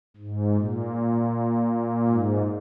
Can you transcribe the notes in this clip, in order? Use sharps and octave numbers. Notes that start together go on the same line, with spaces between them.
G#2
A#2
G#2